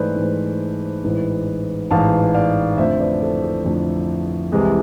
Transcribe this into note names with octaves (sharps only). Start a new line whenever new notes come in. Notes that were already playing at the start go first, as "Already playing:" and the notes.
Already playing: G#2 E3 A3 B4 C5 D5
G#2 E3 A3
A1 G#2 E3
A1 G#2 E3 F5 A5
D5 F5
F2 D3 F3 A3 C5 E5
B4 D5
A4 C5
A4
F2 D3 F3 A3
C2 C3 E3 G#3 G#4